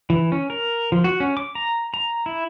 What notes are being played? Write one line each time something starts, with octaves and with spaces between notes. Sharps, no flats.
E3
C#4
A#4
F3
F#4
C#4
D6
A#5
A#5
E4